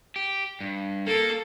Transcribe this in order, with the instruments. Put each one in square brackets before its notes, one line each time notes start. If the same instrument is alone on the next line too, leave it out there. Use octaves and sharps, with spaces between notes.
[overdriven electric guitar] G4
G2
[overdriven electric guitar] A#3 [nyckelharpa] A4